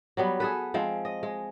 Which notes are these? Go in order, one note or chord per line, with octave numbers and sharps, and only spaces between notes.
F#3 G3 B3
G#4 A4 B4
F3 G#3 C4
D#5
G#3